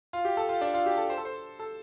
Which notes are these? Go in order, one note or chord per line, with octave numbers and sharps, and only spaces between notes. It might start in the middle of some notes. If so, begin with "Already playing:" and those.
F4
G4
A4
F4
D4
F4
G4
A4
C5
A4
C5
A4